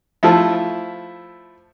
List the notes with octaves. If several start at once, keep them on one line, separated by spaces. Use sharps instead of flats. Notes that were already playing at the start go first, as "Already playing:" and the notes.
F3 A3 E4